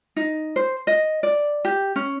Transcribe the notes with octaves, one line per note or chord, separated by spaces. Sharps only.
D#4
C5
D#5
D5
G4
C#4